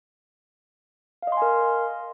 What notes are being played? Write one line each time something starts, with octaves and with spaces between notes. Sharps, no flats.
A#4 D#5 F5 G#5 C6